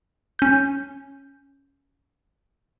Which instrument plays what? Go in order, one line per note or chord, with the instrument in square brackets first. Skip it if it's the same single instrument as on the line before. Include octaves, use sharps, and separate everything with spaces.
[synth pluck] C#4 G6